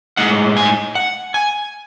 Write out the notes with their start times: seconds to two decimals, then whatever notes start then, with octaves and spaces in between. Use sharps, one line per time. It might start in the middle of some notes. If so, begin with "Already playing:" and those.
0.17 A2 G#3 D#4 F#5
0.57 G#5
0.95 F#5
1.34 G#5